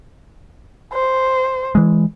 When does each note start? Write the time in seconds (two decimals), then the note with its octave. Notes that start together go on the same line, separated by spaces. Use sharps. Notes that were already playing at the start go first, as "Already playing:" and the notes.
0.93 C5
1.75 E3 G#3